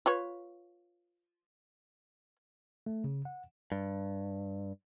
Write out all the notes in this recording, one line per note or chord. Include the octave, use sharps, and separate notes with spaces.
F4 B4 C#5
A3
C#3
F#5
G2